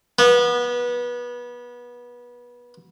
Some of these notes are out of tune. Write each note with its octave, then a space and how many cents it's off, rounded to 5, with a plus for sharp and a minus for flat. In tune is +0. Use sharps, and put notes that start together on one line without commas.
B3 -25